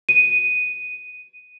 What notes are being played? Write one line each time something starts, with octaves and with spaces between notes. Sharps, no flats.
D#7